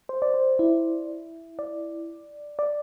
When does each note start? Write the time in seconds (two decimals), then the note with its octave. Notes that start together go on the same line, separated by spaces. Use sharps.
0.09 C5
0.22 D5
0.34 C5
0.59 E4
1.59 D5
2.59 D5